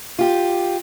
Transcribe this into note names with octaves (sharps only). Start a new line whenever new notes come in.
F4 G4